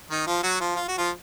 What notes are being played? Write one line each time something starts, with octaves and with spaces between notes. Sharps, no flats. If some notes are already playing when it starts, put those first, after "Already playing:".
D#3 D#4
F3 F4
F#3 F#4
F3 F4
F4
F#4
F3 F4